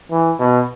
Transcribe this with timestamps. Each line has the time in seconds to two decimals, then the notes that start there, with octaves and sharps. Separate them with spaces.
0.11 E3
0.39 B2